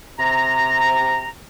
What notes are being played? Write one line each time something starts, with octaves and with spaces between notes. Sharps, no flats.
C3 A#5